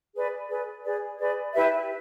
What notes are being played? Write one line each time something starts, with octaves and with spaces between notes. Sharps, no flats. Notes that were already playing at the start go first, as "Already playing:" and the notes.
G#4 B4 D5
G#4 B4 D5
G#4 B4 D5
G#4 B4 D5
E4 G4 B4 E5